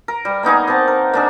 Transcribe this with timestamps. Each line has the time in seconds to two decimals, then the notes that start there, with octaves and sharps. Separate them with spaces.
0.08 A#4
0.25 G3
0.43 A#3 B3 D#4 G#4
0.67 A#3 C4 F#5 A5
0.88 A#4
1.14 A#3 D4 G#4